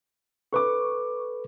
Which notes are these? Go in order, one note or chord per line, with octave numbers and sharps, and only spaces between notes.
A4 B4 C#6 D6